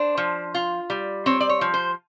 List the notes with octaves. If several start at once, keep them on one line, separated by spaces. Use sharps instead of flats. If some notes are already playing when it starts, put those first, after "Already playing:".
Already playing: D4 C5
F3
F4
G3
C4 C#5
D5
C#5
F3
C5